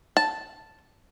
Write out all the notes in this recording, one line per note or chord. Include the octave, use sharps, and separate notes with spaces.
A5